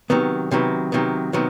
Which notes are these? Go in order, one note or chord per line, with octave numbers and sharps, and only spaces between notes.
C3 D#3 F#3 B3
C3 D#3 F#3 B3
C3 D#3 F#3 B3
C3 D#3 F#3 B3